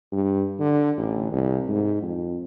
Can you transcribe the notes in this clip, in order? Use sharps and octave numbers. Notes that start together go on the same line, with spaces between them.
G2
D3
A1
C2
G#2
F2